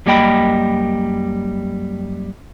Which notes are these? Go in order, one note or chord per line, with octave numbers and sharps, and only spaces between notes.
F#2 G3 A#3 D#5 G5 B5